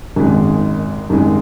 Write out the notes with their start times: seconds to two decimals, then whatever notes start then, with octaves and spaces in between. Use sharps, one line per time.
0.16 G#1 F#2 D#3 G#3
1.10 G#1 F#2 D#3 G#3